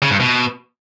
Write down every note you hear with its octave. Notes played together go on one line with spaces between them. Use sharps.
C#3
G2
B2